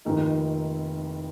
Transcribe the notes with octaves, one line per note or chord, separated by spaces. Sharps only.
F1 F2 D#3 A#3 D#4